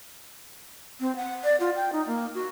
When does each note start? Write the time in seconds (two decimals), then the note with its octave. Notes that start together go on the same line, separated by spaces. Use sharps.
1.00 C4
1.16 F#5
1.44 D5
1.60 F4
1.76 G5
1.93 D#4
2.07 A#3
2.34 F#4